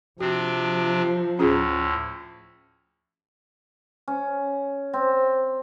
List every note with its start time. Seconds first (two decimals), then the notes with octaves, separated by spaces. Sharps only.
0.20 C3 F3 C4 D4 F#4
1.39 D2 A2 C#4 F4 G#4
4.08 C#4
4.93 C4